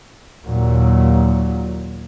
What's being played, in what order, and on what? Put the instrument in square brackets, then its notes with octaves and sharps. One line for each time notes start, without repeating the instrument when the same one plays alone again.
[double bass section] D#2 A#2 F#3